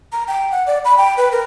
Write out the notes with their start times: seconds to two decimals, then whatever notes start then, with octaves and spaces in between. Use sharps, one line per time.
0.12 A#5
0.28 G5
0.51 F#5
0.67 D5
0.85 B5
0.97 G5
1.17 B4
1.32 A#4